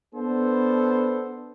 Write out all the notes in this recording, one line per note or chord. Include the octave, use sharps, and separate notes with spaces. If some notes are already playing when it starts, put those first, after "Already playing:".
B3 D4 A4 C5